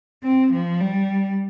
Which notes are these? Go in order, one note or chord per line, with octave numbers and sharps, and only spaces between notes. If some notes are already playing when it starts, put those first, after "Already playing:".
C4
F3
G3